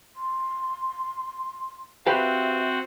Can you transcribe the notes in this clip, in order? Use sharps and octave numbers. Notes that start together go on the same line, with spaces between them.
C6
C4 F#4 G4 B4 E5 F5